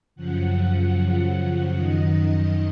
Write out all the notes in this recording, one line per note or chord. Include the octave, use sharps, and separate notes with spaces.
F#2 C#3 F3 F#5
F#2 D#3 D#5